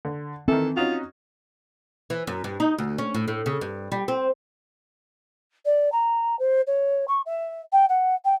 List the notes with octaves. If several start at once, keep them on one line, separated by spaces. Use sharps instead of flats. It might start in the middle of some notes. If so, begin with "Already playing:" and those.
D3
D#3 E3 C4 A4
C#4 D#4 F4 F#4
E3
F#2
G2
D#4
D2
C#4
A2
A2
C#3
G2
G3
C4
D5
A#5
C5
C#5
C#6
E5
G5
F#5
G5